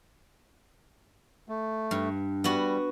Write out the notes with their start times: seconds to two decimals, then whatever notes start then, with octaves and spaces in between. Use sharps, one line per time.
1.49 A3
1.91 G2
2.44 G3 B3 F#4